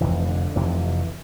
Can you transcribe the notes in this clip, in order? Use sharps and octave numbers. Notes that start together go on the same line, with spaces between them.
F1 F2 C3 E3
D3
F1 F2 C3 E3